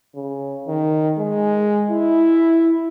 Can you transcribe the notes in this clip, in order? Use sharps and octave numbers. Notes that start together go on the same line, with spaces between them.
C#3
D#3
G#3
E4